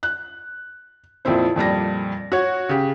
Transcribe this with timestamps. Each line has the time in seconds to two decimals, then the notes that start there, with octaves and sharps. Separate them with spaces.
0.03 F#6
1.25 F2 A#2 C4 E4 C5
1.56 F2 A#2 G3 A#6
2.32 F#4 C#5
2.69 C#3 G4